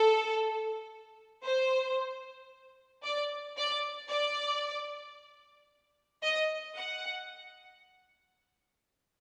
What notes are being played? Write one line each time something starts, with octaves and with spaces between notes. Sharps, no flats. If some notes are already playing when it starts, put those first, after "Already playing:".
Already playing: A4
C5
D5
D5
D5
D#5
F#5